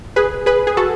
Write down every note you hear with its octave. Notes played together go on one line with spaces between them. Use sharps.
G#4 B4
G#4 B4
G#4
F#4 A4